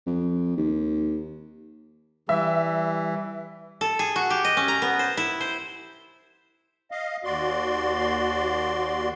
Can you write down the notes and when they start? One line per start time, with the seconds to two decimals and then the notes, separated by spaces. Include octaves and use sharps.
0.06 F2
0.57 D#2
2.29 E3 G3 E5
3.81 A4
3.99 G#4
4.16 F#4
4.30 G4
4.45 D#5
4.57 C#4
4.68 A#5
4.82 B3
4.99 C5
5.17 E4
5.41 C5
6.91 D#5 F5
7.25 D#2 F#4 D5 C6